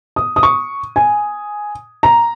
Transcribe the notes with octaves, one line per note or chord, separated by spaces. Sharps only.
D#6
D#6
C#6
G#5
A#5